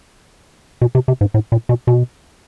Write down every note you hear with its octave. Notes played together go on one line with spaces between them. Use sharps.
B2
C3
C3
G#2
A2
A#2
B2
B2